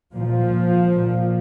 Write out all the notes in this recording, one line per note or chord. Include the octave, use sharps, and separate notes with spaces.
A#2 F3
A#2